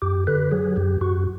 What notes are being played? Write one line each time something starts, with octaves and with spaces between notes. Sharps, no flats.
F#2 G4
D3 B4
F#3 G#4
F#2 G4
F#2 F#4